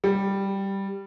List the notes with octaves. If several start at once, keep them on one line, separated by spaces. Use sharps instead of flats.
G3